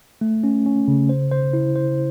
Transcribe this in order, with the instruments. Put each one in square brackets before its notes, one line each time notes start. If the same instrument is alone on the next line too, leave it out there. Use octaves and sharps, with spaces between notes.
[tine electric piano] A3
C#4
C#4
C#3
C5
C5
E4
C5